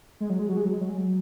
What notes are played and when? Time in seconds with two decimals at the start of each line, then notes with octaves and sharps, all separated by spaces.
0.20 G#3
0.30 F#3
0.39 G#3
0.49 F#3
0.57 G#3
0.65 F#3
0.73 G#3
0.81 F#3
0.89 G#3
0.97 F#3